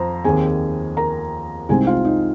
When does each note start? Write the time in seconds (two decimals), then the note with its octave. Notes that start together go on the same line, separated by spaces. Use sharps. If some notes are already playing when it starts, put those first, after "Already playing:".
Already playing: F2 C5 A#5
0.24 D#2 D#3 C4 G#4 G#5
0.97 A#4 A#5
1.69 C2 C3 G#3 C4 D#4 G#4 G#5
1.87 F4 F5
2.05 D#4 D#5